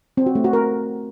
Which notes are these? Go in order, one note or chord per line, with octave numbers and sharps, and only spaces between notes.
C4
F#4
A3
F#4
A#4